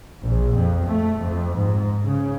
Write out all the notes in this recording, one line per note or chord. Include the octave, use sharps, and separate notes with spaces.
A#1
F2
A3
F2
G#2
C#3